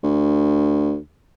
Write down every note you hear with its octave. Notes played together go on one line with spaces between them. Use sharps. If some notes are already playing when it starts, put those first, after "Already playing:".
D2